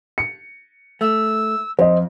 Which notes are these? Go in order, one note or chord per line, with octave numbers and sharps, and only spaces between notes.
C#7
A3 E6
F2 C5 D#5